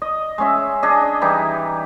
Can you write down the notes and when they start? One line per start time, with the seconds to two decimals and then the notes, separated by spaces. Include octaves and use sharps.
0.02 D#5
0.38 G#3 C#4 E5
0.83 D4 G#4 D#5
1.22 E3 G3 D#4